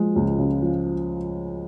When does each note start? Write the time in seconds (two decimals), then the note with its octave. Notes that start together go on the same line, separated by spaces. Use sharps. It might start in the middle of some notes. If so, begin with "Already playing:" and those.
Already playing: F3 G#3
0.16 C#2
0.39 C#3
0.62 F3